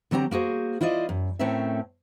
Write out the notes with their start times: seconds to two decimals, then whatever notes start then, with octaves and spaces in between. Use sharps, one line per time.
0.11 D3 F#3 C4 G4 A#5
0.31 A#3 F#4 G#4 C5
0.81 E4 F4 C5 D5 D#5
1.09 F#2
1.39 A2 A3 C4 C#4 A#4 E5